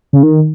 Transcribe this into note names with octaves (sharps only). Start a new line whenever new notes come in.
C#3
D#3